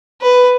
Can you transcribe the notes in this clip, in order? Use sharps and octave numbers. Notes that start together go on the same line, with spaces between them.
B4